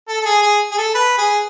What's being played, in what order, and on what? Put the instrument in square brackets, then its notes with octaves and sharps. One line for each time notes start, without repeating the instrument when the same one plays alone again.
[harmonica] A4
A4
G#4
G#4
G#4
A4
B4
G#4